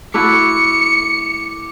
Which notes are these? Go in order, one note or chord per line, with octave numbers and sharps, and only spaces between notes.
A3 E4 F#4 D6 C#7